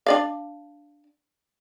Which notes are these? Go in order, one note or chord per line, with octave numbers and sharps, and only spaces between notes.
D4 D5 F5